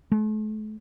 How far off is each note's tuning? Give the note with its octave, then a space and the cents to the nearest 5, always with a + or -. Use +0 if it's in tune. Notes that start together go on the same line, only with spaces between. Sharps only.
A3 -40